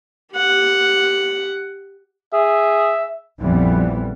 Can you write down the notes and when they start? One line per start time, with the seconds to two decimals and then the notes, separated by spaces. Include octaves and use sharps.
0.35 G4 F#5
2.33 G#4 E5
3.40 A#1 F2 E3 G3 B3